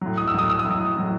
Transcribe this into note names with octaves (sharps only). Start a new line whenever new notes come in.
A2 F#3
D#6
E6
A2 F#3 D#6
E6
D#6
A2 F#3
A2 F#3